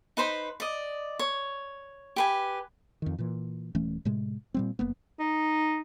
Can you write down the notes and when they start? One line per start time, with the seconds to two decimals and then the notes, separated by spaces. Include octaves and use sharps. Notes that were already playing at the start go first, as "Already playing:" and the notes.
0.17 D#4 B4 C5 B5
0.60 D5 D#5
1.19 C#5
2.16 G4 B4 G#5
3.02 F2 D#3
3.19 A#2 E3
3.75 D#1 E3 A3 C#4
4.05 A2 C3 G#3
4.54 A#2 G3 C4
4.79 F#1 A#3 B3
5.20 D#4